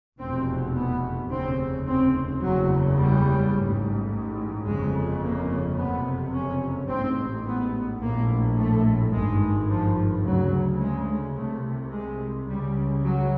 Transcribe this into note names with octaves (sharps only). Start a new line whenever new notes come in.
F1 E2 B2 C4
B3
F1 D#2 C#3 C4
C4
F#1 E2 C#3 F#3
G3
A1 G#2
G1 F2 C#3 G#3
A#3
F#1 F2 C3 B3
C#4
A1 G#2 C4
B3
A#1 A2 A#3
A3
G#1 G2 G#3
F3
D2 C#3 F#3
G#3
C2 C3 A3
G#3
C#2 C#3 G3
F#3